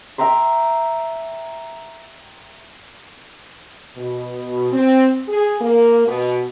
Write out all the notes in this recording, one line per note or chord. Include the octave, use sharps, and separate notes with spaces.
E5 G5 A#5 C6
B2
C4
G#4
A#3
B2